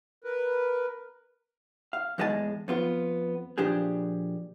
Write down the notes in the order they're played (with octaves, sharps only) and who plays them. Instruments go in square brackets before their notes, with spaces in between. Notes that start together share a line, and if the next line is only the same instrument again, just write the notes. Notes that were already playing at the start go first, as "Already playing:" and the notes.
[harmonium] A#4 B4
[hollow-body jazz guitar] F5
E2 A2 G#3 D#5 G#5 A5
F2 B3 F4
A#2 F3 D4 G4 G#4